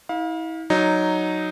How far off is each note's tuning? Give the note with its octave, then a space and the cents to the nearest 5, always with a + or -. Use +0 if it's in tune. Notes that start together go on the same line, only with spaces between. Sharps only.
E4 -35 F5 +25
F#3 +0 D#4 -5